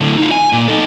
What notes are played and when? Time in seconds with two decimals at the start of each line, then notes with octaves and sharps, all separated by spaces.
0.01 A2 D3
0.17 D#4 F4
0.31 G#5
0.53 A#2
0.68 D#4 A4